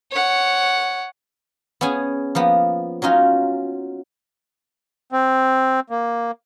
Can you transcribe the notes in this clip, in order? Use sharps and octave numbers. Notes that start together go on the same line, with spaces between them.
C#5 F#5
B3 C#4 G#4 G#5
F3 A#3 B3
F#3 C#4 D#4 F4
C4
A#3